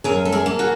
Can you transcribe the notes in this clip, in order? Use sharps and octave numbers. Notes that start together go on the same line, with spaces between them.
F#2 G#4 A#4
A4
G#4 A#4
A#3
F#4 G#4